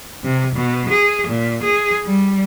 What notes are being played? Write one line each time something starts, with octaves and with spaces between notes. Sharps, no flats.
C3
B2
G#4
A#2
G#4
G3